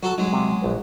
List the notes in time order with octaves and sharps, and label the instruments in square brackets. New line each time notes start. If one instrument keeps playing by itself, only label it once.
[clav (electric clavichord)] F#3 [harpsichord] F#4 A4
[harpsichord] F#3 G#3 [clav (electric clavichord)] D#4
[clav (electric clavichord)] C3
A#1 B4